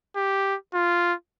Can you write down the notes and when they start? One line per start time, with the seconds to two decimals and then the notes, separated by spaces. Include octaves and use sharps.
0.16 G4
0.74 F4